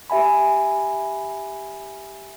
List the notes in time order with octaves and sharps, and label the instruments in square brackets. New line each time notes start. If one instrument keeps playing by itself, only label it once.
[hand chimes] G4 E5 G#5 B5